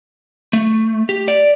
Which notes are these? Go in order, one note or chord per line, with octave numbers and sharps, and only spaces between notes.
A3
G4
D5